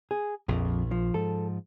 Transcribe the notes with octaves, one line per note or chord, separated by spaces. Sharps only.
G#4
A#1 F2
F3
G#2 F3 A4